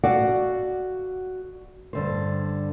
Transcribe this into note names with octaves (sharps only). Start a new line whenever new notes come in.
F#4 A4 D5 F5 F#5
G2 D3 C5